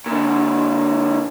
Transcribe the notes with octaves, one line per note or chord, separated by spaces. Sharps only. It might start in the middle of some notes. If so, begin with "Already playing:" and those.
A#2 D3